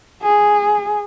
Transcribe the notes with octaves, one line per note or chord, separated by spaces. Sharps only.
G#4